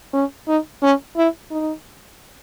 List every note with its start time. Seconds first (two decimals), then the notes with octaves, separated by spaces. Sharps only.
0.14 C#4
0.48 D#4
0.83 C#4
1.17 E4
1.51 D#4